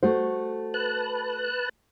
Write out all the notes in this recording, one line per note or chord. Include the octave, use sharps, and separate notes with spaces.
A3 F#4 C5
B4 A5 F#6